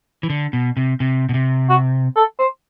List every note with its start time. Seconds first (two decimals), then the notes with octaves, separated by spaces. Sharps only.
0.23 E3
0.30 D3
0.53 B2
0.77 C3
1.00 C3
1.29 B2
1.34 C3
1.69 F#4
2.16 A4
2.39 C5